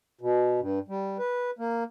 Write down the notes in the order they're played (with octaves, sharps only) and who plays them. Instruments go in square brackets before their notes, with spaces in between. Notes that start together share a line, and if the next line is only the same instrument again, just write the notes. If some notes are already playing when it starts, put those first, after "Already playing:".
[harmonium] B2
G2
G3
B4
A#3